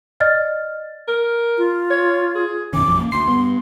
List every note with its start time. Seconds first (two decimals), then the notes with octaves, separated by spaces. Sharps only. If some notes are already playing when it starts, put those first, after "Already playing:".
0.20 D5 D#5 F6 A6
1.08 A#4
1.58 F4
1.90 C#5
2.35 G#4
2.73 F#2 B2 D#3 C#4 D6
2.87 A1 F2 F3
2.99 A#3
3.12 D2 C6 C7
3.28 G2 B3